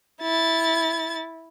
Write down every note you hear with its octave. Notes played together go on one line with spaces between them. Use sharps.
E4 A6